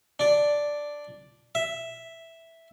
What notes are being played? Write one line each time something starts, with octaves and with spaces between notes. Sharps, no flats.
D4 D5
E5